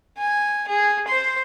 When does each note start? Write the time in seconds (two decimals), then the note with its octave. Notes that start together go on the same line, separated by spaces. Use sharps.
0.18 G#5
0.68 G#4
1.08 C5 C6